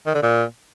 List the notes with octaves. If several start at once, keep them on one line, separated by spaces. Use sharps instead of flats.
D#3
D3
A#2